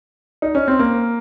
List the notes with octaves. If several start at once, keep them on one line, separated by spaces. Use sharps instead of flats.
D#4
C#4
C4
A#3